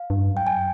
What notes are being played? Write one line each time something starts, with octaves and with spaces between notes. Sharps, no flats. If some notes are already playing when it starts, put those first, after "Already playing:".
Already playing: F5
G2
F#2
G5
G#5